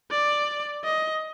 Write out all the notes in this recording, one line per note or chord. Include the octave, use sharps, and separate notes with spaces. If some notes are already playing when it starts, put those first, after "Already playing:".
D5
D#5